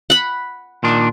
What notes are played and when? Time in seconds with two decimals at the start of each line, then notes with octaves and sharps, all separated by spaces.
0.10 F#5 B5
0.84 A#2 D#3 D4